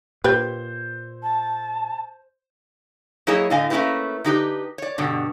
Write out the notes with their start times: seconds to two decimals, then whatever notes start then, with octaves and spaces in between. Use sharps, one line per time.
0.24 A#2 G4 B4 C5 G6
1.23 A5
3.27 F#3 A#3 E4 G#4 C#5 D#5
3.50 A2 D3 D#5 F5 G#5
3.70 A3 A#3 C#4 E4 G4 B4
4.24 D3 D#4 G4 B4
4.78 C#5 D5
4.98 G2 B2 D3